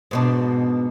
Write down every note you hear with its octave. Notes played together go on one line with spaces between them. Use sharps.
G#2 B2 D4